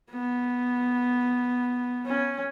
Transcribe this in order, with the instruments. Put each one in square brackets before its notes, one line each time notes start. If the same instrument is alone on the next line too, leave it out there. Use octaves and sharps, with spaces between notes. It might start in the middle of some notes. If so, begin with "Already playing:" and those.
[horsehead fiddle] B3
C#4